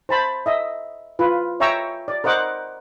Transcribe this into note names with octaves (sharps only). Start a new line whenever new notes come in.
C5 A5 B5
D#5 E5
F4 B4
C#5 E5 G5 A#5 C#6 E6
D5
A#4 C5 D#5 F#5 D6